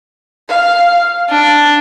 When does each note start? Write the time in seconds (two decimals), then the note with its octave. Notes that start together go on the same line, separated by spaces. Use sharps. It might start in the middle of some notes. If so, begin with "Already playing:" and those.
0.48 F5
1.29 D4